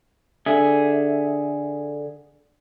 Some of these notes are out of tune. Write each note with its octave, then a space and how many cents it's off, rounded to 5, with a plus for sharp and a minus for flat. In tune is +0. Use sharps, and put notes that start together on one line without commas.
D3 +0 G#4 +0 E5 +0